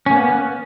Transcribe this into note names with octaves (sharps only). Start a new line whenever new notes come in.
A#3 B3 C#4